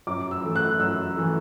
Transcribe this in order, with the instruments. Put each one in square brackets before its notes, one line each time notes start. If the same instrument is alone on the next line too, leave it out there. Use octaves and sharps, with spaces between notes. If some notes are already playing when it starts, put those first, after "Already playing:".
[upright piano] F#2 D6
E6
E3 A3
F#6
F#2 E6
E3 A3